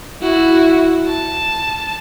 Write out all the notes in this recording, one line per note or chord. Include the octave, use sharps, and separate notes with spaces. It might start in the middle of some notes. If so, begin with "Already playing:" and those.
E4 F#4
A5